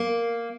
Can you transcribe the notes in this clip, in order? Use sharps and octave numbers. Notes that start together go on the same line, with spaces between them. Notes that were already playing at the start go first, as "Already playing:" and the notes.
Already playing: A#3